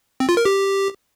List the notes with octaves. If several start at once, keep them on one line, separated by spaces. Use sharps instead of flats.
C4
F4
A#4
G4